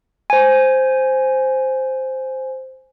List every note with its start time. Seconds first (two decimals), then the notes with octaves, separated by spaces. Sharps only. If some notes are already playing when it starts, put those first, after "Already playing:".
0.30 C5 G#5